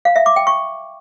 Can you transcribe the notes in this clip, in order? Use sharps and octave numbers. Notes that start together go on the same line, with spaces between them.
F5
E5
D6
G5
C#6